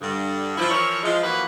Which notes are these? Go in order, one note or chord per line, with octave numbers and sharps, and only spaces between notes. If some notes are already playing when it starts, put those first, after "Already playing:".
G2 D3
F3 E4
E3 F3 E4 A#4 C#5
F3 G#3
E3 F3 A#3 E4 F#4 B4